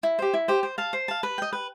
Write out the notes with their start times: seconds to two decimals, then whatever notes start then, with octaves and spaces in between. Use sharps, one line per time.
0.03 E4
0.19 G4 C5
0.34 E4
0.48 G4 C5
0.63 C5
0.78 F5 A5
0.93 C5
1.08 F5 A5
1.23 B4
1.38 D#5 G5
1.53 B4